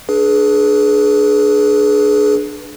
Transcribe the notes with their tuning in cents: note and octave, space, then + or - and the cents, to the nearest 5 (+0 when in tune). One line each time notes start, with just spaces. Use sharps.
D4 +10 G#4 +25 B4 -15